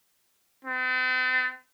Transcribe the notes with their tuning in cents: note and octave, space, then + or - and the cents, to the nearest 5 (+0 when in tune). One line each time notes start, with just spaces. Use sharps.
C4 -45